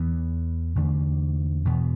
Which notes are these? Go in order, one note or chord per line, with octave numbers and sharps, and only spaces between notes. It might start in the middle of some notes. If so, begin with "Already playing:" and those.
Already playing: E2 E3 B3
E2 D3 A3 D4
E2 B2 B3